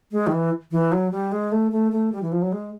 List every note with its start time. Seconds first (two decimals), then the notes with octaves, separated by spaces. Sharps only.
0.12 G#3
0.27 D#3
0.32 E3
0.71 E3
0.92 F#3
1.12 G3
1.32 G#3
1.52 A3
1.72 A3
1.92 A3
2.12 G3
2.22 E3
2.32 F3
2.42 F#3
2.52 G#3